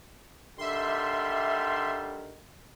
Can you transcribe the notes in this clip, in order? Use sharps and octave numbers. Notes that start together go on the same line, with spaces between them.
D3 D#3 G3 E5 C6